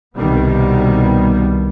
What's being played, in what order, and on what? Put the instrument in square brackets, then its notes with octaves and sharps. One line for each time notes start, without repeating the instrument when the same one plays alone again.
[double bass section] C2 B2 D#3 G3 B3